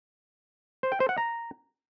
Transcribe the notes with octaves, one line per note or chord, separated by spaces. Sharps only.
C5
G5
C5
F#5
A#5